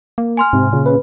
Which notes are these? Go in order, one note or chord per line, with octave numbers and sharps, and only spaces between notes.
A#3
G#5 C6 F6
G#2 C3
A#2 C#3
B4